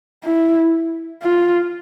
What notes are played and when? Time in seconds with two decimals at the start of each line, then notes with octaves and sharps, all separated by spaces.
0.24 E4
1.23 F4